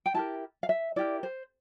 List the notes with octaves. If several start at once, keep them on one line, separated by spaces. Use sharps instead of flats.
G5
E4 G4 A#4 A5
F5
E5
E4 G4 A#4 D5
C5